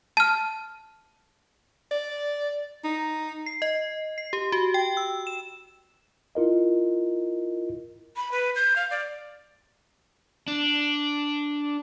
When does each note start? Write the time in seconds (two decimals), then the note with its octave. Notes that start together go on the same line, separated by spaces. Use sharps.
0.17 A5 F6
1.91 D5
2.84 D#4
3.46 C7
3.62 D#5
4.18 C7
4.33 G4
4.52 F#4
4.74 G5
4.97 E6
5.27 E7
6.35 E4 F4 A#4 D#5
8.16 B5
8.32 B4
8.56 G6
8.76 F5
8.91 D5
10.48 D4